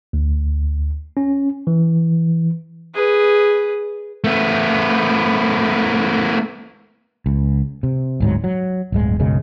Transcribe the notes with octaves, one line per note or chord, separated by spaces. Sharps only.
D2
C#4
E3
G#4 B4
A3 B3
C#2
C3
D1 G#2 F#3
F#3
D1 G1 G#3
B1 F#2 C#3 G#3